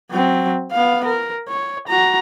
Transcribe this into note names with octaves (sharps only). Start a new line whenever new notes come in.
F#3 C4
B3 F5
A#4
C#5
F#4 A#5